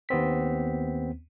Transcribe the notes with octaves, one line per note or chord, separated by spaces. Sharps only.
D#2 B3 C4 B6